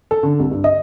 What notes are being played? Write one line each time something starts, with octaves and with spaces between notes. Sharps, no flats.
A4
D3
C2
G2
D#5